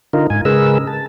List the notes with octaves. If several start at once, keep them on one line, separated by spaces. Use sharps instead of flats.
D3 D#4 F4 A#4
G#2 G#5
C#3 G#3 G#4 A#4 B4 E6
A5